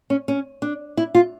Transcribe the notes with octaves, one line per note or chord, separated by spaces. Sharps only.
C#4
C#4
D4
E4
F4